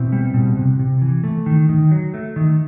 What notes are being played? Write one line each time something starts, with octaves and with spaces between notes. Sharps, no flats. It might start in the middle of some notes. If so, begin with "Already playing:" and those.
Already playing: B2 C4 E4
G3
B2
C3
C3
E3
A3
D#3
D#3
F#3
A3
D#3